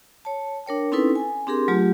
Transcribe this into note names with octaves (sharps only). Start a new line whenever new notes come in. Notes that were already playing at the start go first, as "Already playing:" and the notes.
C#5 A5
D4 A#4 C#5 G5
C4 C#4 D#4 E4 A4 B4
G#5
C4 D4 G4 G#4 A#4 C6
F#3 A3 F4 G4